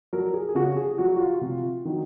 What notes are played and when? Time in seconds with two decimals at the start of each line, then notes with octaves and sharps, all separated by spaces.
0.13 F#3 A#4
0.33 G#4
0.49 G#4
0.55 C#3 F#4
0.77 G#4
0.98 F#3 F#4
1.16 F#4
1.21 F4
1.41 C3 F4
1.85 D#3 F#3